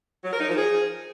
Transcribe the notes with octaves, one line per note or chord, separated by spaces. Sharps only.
F#3
A#4
D#4
F3
G#4